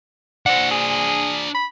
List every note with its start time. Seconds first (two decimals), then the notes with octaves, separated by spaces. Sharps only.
0.46 D4 C5 F#5
0.71 G#4
1.55 B5